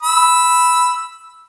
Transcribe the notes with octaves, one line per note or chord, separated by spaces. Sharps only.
B5 E6